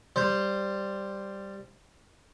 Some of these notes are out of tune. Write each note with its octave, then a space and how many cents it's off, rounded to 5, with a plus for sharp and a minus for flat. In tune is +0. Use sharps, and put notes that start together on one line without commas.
G3 +0 C5 +0